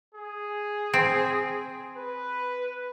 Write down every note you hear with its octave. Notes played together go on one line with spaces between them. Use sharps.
G#4
C4
B4